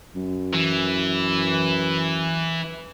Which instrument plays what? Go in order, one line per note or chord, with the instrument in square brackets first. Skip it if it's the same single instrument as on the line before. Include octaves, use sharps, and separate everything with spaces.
[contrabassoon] F#2
[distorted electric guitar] E3